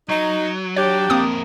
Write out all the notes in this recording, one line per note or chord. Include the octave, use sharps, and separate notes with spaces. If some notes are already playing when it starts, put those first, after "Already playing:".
F#3 D#4
D4 G4 C#5
F2 A#3 C4 A#4 D#6